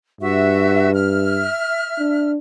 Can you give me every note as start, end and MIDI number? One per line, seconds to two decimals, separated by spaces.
0.21 1.47 43
0.21 0.93 66
0.21 0.93 76
0.95 2.30 76
0.95 2.30 89
1.99 2.38 62